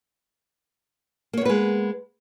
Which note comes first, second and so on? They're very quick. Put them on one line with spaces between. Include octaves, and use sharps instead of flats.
A#3 C#5 B3 B4 G#3